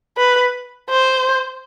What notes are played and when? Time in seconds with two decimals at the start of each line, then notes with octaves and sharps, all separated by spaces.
0.18 B4
0.90 C5